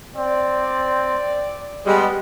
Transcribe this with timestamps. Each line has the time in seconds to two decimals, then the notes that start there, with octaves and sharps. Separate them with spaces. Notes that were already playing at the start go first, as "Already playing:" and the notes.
0.16 C4 D5
1.86 G3 G#3 B3